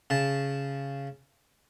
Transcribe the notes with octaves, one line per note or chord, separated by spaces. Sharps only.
C#3 A5